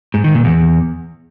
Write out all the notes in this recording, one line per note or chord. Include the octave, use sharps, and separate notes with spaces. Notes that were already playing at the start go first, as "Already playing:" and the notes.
G#2
D#3
A#2
E2